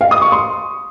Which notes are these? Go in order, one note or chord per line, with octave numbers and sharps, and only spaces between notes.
F5
D#6
C#6
C6